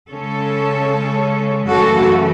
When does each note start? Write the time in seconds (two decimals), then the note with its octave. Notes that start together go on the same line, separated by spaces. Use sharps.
0.11 C#3 G#3 C#4 A4 C#5
1.69 F#2 C#3 E3 A3 F#4 A4